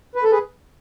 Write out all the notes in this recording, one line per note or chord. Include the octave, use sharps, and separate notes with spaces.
B4
A4
G#4 B4